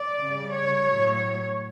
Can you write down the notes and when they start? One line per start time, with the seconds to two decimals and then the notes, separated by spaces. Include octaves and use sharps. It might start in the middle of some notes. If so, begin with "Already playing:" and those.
Already playing: D5
0.21 C#3 G3
0.53 C#5
0.84 A2 F#3
1.16 C#5